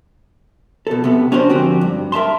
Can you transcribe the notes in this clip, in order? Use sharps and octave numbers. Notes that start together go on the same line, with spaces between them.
B2 A4
C3 B3
C#4 D4 F#4 A#4 C5
F2 G#2 D3 C4 F#4 G4
G2
A#4 E5 A5 C6